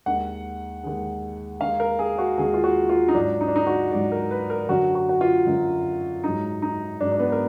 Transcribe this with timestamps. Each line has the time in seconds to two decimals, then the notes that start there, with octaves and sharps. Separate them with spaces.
0.06 D#2 D#3 G#3 F#5
0.84 D#2 D#3 G#3
1.60 D#2 D#3 G#3 F5
1.80 A#4
1.99 G#4
2.18 F#4
2.37 D#2 D#3 G#3 G#4
2.54 F4
2.64 F#4
2.89 F4
3.08 D#4
3.15 G#2 F#3 D4
3.41 D#4
3.48 D4
3.56 D#4
3.67 F#4
3.92 G#2 F#3 D5
4.12 A#4
4.31 B4
4.50 A#4
4.69 F#2 D3 F#3 F#4
4.95 F#4
5.09 F#4
5.21 F4
5.47 F#2 D3 F#3
6.24 G#2 F#3 D#4
6.62 D#4
7.00 G#2 F#3 D4
7.12 D4
7.19 B3
7.32 A#4